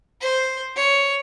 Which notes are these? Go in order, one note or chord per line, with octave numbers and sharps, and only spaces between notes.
C5
C#5